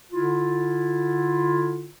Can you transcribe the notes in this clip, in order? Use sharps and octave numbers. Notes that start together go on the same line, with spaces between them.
D3 E4 F4